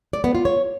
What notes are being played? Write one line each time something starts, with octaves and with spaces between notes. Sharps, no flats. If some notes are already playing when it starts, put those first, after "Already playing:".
D5
B3
F4
C#5